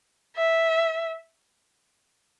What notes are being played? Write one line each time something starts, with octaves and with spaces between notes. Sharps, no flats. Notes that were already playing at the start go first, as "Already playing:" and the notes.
E5